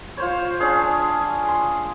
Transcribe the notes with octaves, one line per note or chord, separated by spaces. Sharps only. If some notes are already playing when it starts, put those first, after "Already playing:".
F4 C5 C#5
C#4 D4 G#4 F5
C6